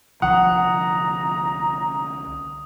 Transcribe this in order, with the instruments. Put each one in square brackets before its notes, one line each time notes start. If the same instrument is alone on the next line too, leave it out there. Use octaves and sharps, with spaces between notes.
[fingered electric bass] C2 D3 F3 [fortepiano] F#5 [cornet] A#5 [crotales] D#6